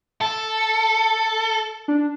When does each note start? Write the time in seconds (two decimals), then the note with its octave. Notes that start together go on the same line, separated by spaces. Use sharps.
0.21 A4 A5
1.88 D4